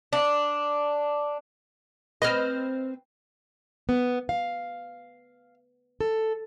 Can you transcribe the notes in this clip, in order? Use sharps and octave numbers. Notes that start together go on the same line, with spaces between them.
D4
C4 B4 D#5 F6
B3
F5
A4